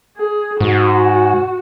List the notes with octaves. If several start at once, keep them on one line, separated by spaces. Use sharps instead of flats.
G#4
G#2 F#4